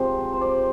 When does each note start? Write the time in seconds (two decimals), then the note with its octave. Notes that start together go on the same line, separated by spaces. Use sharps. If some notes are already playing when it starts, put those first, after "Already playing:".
Already playing: C3 F3 G#3 G4 C5
0.33 C5
0.41 D5